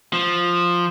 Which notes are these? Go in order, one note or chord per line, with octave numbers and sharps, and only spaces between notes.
F3